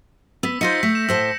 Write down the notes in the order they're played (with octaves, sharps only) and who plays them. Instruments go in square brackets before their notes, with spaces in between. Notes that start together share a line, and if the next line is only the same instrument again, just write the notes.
[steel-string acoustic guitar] B3 [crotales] E6 B6
[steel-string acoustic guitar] D#4 F4 C5 [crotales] G6 A#6 C#7
[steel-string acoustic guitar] A3 [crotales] B6
[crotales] E7
[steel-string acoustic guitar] A2 C5 A5 [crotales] E6